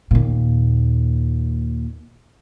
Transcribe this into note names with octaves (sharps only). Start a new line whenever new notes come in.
D#2 A#2